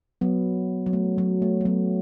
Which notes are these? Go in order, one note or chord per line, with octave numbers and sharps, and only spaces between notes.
F#3 B3
F#3
A3
F#3
A3
A3
F#3 B3